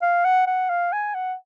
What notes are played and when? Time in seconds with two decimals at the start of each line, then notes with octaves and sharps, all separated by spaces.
0.02 F5
0.25 F#5
0.47 F#5
0.70 F5
0.93 G#5
1.14 F#5